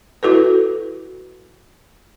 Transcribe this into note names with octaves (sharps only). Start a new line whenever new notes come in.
E4 F#4 A4 B4